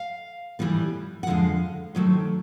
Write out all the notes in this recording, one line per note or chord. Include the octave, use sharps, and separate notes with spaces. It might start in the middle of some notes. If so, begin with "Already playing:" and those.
Already playing: F5
A2 E3 G3 B3
F#5
F2 D3 F3 G#3 F5
D#2 D#3 F#3 A3 C4